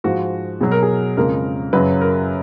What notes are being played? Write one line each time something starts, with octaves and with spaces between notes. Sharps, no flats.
G#2 F3 G#3 F#4
B2 F#3 G#4
A#4
G#4
F2 C#3 G#3 A#4
F#2 C#3 F#3 B4
A#4